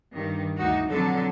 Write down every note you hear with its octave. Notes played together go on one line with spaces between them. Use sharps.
G2 D#3
D2 D#4 F#4
F2 B2 D3 F#3 A4